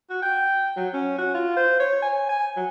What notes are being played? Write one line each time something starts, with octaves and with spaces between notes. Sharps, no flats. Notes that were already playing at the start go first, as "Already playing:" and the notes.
F#4
G5
F#3
C#4
F#4
F4
C5
C#5
G#5
G#5
F#3